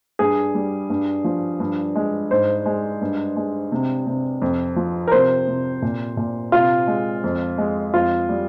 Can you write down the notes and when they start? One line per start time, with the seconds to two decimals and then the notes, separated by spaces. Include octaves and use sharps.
0.19 G2 G#4
0.55 G3
0.90 G2
1.24 F3
1.60 G2
1.95 G#3
2.31 G#2 C5
2.66 G#3
3.01 G2
3.36 G#3
3.72 C3
4.07 C3
4.42 F2
4.76 F3
5.07 A#4
5.12 C3 C5
5.47 C3
5.82 A#2
6.17 A#2
6.52 C3 F4
6.87 G#3
7.24 F2
7.58 G#3
7.94 F2 F4
8.29 G3